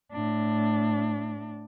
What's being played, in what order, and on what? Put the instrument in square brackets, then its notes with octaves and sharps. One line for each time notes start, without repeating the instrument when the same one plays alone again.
[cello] A2 D4